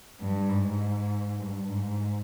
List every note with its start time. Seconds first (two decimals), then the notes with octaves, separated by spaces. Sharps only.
0.20 G2
0.49 G#2
1.39 G2
1.68 G#2